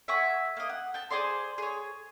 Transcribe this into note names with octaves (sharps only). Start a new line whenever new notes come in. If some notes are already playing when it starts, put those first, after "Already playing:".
E5 F#5 G#5 C#6
A#3 D#5
F#5
G5 A5
G#4 C5 D5 C6
G#4 C#5